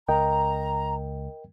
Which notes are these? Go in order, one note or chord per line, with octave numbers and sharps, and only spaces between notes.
C#2 A#4 D#5 G5 A#5